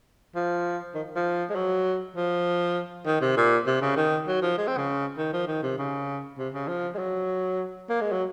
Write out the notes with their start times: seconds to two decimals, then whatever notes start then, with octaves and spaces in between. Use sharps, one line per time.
0.35 F3
0.94 D#3
1.16 F3
1.50 G#3
1.55 F#3
2.16 F3
3.06 D#3
3.21 C3
3.37 A#2
3.67 C3
3.82 C#3
3.96 D#3
4.27 F#3
4.42 F3
4.57 G#3
4.67 C4
4.77 C#3
5.17 D#3
5.33 F3
5.48 D#3
5.63 C3
5.78 C#3
6.38 C3
6.54 C#3
6.68 F3
6.94 G#3
6.98 F#3
7.89 A#3
8.01 G#3
8.12 F#3